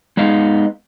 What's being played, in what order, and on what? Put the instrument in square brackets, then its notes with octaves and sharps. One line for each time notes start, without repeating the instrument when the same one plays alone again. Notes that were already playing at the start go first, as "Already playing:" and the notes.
[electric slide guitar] G#3 B3 D#4 F5